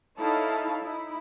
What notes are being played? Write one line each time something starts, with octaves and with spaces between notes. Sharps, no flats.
D#4 E4 A4 C#5 F5 A5
D#4 E4